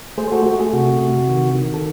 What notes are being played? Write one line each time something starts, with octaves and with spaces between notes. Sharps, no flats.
A3 G#4 C5
F#4 A4
A3 F#4
G#4
C3 F#4
C3
D#3
D#3
A4